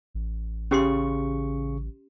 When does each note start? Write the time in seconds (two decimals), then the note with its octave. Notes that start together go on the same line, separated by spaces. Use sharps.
0.14 A1
0.71 C#3 C#4 G4 C6 C#6